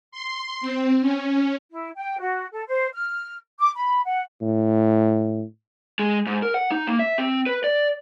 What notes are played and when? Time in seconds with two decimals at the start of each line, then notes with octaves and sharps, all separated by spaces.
0.12 C6
0.61 C4
1.01 C#4
1.71 E4
1.96 G5
2.19 F#4
2.52 A4
2.67 C5
2.94 F6
3.59 D6
3.75 B5
4.05 F#5
4.42 A2
5.99 G#3
6.27 G#2
6.43 A#4
6.54 F#5
6.71 D#4
6.87 A#3
6.99 E5
7.18 C4
7.47 B4
7.64 D5